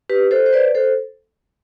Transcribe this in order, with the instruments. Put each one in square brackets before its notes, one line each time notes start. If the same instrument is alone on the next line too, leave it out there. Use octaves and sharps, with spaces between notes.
[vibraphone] G4 B4
A4 C5
C5
B4 D5
A4 C5